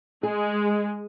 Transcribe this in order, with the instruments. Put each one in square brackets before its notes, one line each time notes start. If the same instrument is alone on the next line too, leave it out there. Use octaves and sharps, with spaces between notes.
[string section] G#3 [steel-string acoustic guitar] G#4